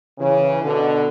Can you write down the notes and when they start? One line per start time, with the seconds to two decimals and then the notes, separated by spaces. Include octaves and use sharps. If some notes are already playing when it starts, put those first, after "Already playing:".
0.18 C#3 E3
0.62 B2 D3